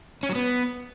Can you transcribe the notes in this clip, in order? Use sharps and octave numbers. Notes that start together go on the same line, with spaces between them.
C#4
F#3
B3